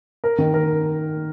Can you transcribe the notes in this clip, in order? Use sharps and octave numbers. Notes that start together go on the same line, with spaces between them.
A#4
D#3
A#4